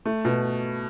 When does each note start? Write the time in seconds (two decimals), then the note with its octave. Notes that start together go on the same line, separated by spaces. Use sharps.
0.06 A3
0.25 B2